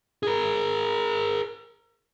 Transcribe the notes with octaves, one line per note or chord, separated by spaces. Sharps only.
G#4 A#4